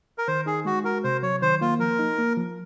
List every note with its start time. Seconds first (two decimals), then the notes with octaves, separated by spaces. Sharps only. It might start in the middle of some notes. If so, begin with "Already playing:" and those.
0.18 A#4
0.28 D#3 C5
0.46 D#4 G#4
0.65 G#3 F#4
0.84 F#4 A#4
1.04 C3 C5
1.23 F#3 C#5
1.42 D#3 C5
1.61 A#3 F4
1.79 F3 A#4
1.99 D#4
2.19 A#3
2.37 F3